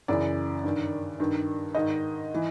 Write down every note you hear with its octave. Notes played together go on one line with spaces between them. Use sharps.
F#2 C#3 E3 D5
G2 D#3
G2 D#3
G#2 D#3 D#5
E3